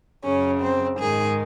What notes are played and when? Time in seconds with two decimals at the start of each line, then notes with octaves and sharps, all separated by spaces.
0.24 F#2 C#3 C#4
0.61 C4
0.99 G#2 D#3 G#4